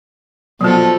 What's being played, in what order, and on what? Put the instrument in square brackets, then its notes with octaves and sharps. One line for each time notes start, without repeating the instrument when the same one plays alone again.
[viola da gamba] B2 F3 A4 [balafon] F#3 B3